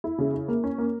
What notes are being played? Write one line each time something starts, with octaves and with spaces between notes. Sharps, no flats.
E4
C#3
E4
A#3
C#4
A#3